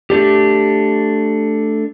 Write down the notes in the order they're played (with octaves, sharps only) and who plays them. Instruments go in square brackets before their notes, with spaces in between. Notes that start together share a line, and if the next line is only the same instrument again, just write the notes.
[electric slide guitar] A3 D4 G4